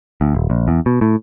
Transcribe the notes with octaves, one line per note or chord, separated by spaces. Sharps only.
D2
D#1
A#1
E2
B2
A2